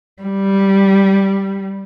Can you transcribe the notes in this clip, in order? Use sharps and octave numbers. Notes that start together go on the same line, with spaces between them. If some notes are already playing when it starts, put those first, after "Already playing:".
G3